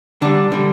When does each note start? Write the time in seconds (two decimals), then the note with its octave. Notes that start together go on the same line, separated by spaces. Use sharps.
0.22 D3 G3 D4
0.52 D3 G3